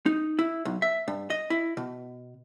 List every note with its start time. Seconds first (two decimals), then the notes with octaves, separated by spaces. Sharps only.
0.06 D#4
0.39 E4
0.65 B1
0.82 E5
1.08 G2
1.30 D#5
1.50 E4
1.77 B2